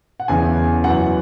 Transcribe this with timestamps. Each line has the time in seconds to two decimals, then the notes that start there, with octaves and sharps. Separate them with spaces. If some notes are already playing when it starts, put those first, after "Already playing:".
0.20 F#5
0.28 E2 C#3 E3 G#5
0.84 F#2 E3 F#5